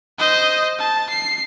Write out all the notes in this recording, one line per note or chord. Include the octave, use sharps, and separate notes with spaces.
C5 D#5
A5
C7